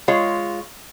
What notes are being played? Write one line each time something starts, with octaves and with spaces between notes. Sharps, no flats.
G#3 F4 C#5